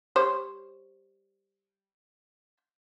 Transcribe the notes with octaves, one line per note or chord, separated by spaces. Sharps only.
G3 C5 C#5